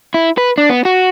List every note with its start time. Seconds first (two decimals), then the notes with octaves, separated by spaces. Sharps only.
0.14 E4
0.38 B4
0.58 D4
0.70 B3
0.85 F#4